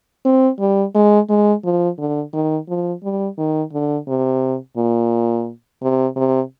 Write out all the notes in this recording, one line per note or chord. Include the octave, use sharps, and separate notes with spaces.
C4
G3
G#3
G#3
F3
D3
D#3
F3
G3
D#3
D3
C3
A#2
C3
C3